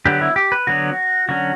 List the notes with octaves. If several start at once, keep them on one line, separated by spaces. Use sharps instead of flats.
D3 F#3 B3 G4
E4
G4
B4
D3 F#3 B3 F#4
D3 F#3 C#4 F#4